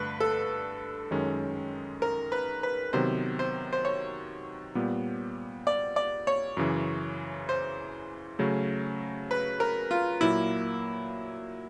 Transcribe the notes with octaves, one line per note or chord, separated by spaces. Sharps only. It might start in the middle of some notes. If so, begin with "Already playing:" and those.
Already playing: G2 D3 A3 B4
A4
F#2 D#3 G#3 C#4
A#4
B4
B4
C3 D#3 F#3 B3 C5
C5
C5
C#5
A#2 G3 B3
D5
D5
C#5
F#2 C#3 E3
C5
C#3 F#3 A3 C#4
B4
A#4
F4
A#2 F#3 A#3 E4